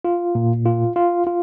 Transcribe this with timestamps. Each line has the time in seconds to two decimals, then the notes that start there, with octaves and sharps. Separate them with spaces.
0.05 F4
0.35 A#2
0.66 F4
0.96 F4
1.27 F4